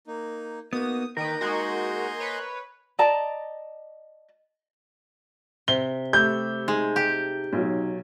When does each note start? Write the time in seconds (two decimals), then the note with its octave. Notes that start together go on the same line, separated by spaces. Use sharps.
0.07 A#3 D#4
0.73 A#3 B3 D#4 F#4 D#6
1.17 D#3 A#3 A#4 B4 G5 D#6 G6
1.41 G#3 D#4 F#4 D#5 G#5 C6
2.20 B4 C#5
2.99 D5 D#5 A5 A#5
5.68 C3 G7
6.13 A3 G4 B5 E6 G6
6.68 G#3 D#4
6.96 G4
7.53 B1 F#3 D#4